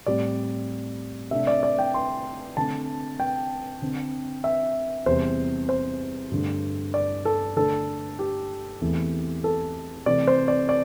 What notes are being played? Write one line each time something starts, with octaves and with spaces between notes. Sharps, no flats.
A2 G3 C4 D5
C3 A3 D4 E5
D5
D5
G5
C6
D3 A3 C4 A5
G5
D3 C4
E5
E2 C3 G3 C4 C5
C5
G2 D3 A3
D5
A4
D3 A3 D4 A4
G4
E2 E3 A3 C4
A4
C3 E3 A3 C4 D5
C5
D5
D5